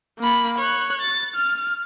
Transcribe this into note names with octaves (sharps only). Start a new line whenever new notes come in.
A#3 B5
C#5 F#6
A6
F6